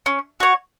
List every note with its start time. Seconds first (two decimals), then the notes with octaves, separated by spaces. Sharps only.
0.06 C#4
0.40 F#4 C#5